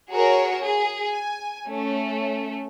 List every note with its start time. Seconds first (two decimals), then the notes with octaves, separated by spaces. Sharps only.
0.10 F#4 G#4 A#4 C#5
0.60 G#4
1.08 G#5
1.68 A3 C#4